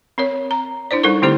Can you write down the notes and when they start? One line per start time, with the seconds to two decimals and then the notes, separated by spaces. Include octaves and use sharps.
0.18 C4 A#4 C#5
0.51 A#5
0.91 D4 E4 C5 D5
1.03 G3 D#4 A4 A#4 C#6
1.22 D3 A3 C4 E4 G4 C5